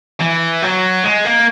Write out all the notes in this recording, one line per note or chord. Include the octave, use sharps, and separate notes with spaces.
E3
F#3
G#3
A#3